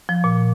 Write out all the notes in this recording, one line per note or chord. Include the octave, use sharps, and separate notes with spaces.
F3
A#2